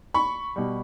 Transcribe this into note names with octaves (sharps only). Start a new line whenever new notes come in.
B5 C#6
B2 G3